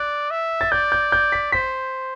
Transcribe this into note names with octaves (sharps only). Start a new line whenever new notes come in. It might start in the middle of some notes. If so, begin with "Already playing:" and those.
Already playing: D5 F#6
E5
A6
D5 G6
G6
G6
B6
C5 B6